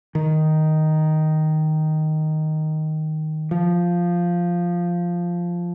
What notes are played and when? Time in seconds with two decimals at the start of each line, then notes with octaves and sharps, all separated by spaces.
0.15 D#3
3.51 F3